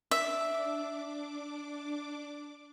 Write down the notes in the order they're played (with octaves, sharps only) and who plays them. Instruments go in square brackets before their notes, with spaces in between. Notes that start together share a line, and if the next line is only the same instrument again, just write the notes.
[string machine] D4 D6 [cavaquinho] E5